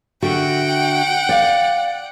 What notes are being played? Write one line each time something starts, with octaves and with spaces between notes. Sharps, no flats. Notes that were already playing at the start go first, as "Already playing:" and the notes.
D3 F#4 E5 F#5 G5
D5 F5